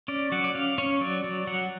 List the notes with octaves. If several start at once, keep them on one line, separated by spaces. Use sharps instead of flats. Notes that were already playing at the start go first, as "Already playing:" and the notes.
C#4 D5
F#3 F#5
D5
C#4 F5
C#4 C#5
F#3 D5
F#3
F#3 F#5